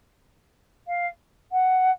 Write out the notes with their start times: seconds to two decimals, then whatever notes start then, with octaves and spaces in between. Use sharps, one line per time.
0.87 F5
1.51 F#5